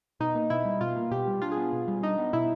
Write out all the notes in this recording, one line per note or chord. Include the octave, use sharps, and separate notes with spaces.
B2 D#4
A#3
B2 E4
G3
B2 F4
A#3
B2 G4
G3
D4 F4
G#4
B3
B2
G3
D4 D#4
B3
B2 E4